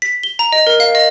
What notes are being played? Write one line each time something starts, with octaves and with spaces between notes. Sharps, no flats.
B6
G7
A#5
D#5
A#4
F5
D#5